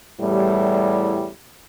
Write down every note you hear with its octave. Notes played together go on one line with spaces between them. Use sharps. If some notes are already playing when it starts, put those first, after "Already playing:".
E2 A2 G3